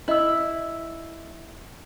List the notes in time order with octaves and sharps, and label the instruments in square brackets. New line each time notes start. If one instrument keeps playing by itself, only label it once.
[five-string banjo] E4 [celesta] D#5 E6